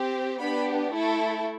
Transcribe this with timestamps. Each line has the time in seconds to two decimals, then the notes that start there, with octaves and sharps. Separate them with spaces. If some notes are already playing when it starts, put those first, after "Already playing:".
Already playing: C4 G4
0.39 B3 D4 G4 B5
0.93 A3 E4 A4